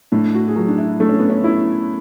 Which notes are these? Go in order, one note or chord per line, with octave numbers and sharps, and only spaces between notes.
A2 D4
F#4
G#4
F#3 F#4
D4
E4
A3 D4
C#4
B3
C#4
E4